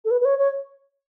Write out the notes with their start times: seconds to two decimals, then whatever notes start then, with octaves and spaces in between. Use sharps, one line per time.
0.05 A4
0.11 B4
0.21 B4
0.25 C#5
0.39 C#5